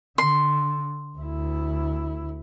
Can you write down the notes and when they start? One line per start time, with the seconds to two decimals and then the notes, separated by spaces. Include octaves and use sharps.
0.18 D3 C6
1.17 D2 E4